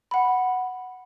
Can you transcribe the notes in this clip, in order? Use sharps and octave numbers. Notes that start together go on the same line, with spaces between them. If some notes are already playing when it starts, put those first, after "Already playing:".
F#5 B5